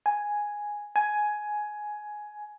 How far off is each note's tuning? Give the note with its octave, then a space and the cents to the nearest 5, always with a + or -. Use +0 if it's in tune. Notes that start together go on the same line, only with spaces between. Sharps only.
G#5 +0
G#5 +10